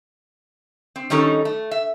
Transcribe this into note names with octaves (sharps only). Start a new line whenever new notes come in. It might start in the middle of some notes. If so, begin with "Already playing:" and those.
C4
D#3 G3 C#4 D#4 A4
A3
E5